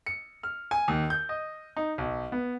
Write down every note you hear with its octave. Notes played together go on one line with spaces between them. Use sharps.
C#7
F6
G#5
D#2
G6
D#5
D#4
B1
B3